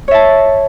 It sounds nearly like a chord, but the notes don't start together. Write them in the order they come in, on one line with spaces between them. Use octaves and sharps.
C#5 E5 A5